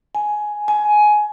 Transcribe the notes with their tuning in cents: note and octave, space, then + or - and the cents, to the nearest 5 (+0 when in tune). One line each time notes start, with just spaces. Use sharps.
G#5 +10
G#5 +15